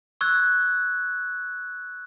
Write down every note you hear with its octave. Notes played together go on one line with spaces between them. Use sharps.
C#6 E6 F#6 G#6